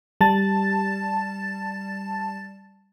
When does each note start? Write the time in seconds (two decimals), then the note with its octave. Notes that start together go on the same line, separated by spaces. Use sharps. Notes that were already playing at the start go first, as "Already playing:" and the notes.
0.21 G3 A5 A6